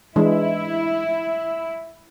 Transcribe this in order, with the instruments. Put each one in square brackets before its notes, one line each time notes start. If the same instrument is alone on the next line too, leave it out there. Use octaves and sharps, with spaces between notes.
[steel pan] E3 G#3 D4 [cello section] E4